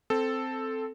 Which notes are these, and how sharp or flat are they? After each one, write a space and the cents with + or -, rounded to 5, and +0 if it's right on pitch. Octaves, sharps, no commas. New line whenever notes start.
C4 -5 A4 +0